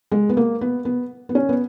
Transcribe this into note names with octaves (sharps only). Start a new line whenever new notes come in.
G#3
B3
A#3
B3
B3
B3
C#4
B3